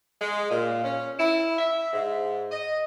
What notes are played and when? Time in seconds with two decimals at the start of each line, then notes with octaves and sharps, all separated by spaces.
0.21 G#3
0.51 A#2
0.84 C#4
1.19 E4
1.59 E5
1.93 G#2
2.52 D#5